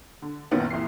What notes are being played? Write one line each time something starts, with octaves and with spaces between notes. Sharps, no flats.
D3
F#1 A#2 D#3 B3 C#4 F#5
C2 A#2 E3 C7